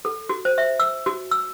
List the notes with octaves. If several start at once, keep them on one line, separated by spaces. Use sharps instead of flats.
A4
F#4
C5
E5
E6
F#4
E6